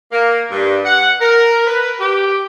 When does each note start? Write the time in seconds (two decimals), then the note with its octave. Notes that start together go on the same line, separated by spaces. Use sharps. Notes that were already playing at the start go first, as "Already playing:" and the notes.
0.12 A#3
0.51 G2
0.85 F#5
1.21 A#4
1.67 B4
2.00 G4